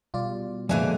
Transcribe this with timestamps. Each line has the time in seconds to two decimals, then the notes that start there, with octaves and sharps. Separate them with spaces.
0.14 B2 G3 F4 D5
0.69 F2 A#2 D3 E3 G#3 D4 A4 G#5